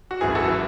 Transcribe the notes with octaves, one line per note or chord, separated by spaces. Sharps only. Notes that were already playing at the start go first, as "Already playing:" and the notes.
F#4
G#1 F#2 E3 G#4
F#4 A4
E3